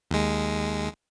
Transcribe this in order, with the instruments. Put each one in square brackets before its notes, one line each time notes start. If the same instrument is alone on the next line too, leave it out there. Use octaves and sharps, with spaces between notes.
[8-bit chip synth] D#2 G#3